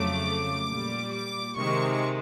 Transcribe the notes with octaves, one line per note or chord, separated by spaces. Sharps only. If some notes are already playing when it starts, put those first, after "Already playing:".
Already playing: F2 C#3 F#3 A3 D6
A#2 G3
D6
C3 D#3 G#3 C#6